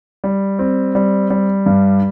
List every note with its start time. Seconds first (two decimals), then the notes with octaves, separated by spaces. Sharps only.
0.24 G3
0.59 C4
0.95 G3
1.30 G3
1.66 G2